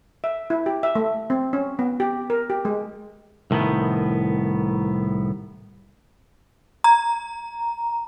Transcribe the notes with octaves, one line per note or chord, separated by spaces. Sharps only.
E5
E4
G4
E5
A3
C4
C#4
B3
G4
A#4
G4
G#3
C2 A2 D#3 B3
A#5